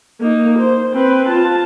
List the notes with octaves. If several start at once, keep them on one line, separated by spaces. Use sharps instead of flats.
A#3 D#4
C5
C4 B4
F4 A5